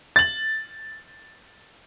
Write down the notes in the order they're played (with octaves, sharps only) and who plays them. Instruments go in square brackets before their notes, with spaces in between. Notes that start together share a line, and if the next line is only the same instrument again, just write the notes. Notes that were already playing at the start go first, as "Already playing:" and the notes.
[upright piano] A6 F#7